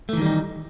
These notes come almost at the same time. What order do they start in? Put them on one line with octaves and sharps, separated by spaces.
A3 E3 D#3 G3 D#4